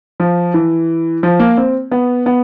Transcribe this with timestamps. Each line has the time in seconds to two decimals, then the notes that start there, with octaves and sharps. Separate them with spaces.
0.20 F3
0.54 E3
1.23 F3
1.40 A#3
1.57 C4
1.91 B3
2.26 B3